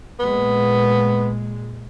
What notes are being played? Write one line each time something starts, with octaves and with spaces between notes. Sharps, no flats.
A#2 G#3 B3